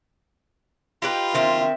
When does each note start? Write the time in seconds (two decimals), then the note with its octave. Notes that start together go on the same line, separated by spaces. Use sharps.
1.02 D#4 F4 G4 B4
1.34 D#3 C4 E5